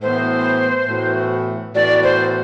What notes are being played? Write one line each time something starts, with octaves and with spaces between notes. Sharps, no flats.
A2 E3 B3 F#4 C5
A2 E3 B3 F#4
A2 E3 B3 F#4 D5
C5